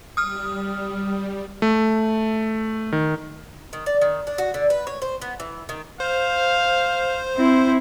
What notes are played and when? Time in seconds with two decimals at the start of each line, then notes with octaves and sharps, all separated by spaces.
0.17 G3 D#6 F6
1.62 A3
2.92 D#3
3.73 D#3
3.86 D5
4.01 D#3
4.27 D4
4.38 F#4
4.54 D3
4.70 B4
4.87 C#5
5.02 C5
5.22 B3
5.40 E3
5.69 D#3
6.00 C5 F5
7.37 C4 E4